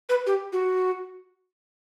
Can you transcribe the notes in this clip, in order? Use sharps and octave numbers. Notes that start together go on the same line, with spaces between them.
B4
G4
F#4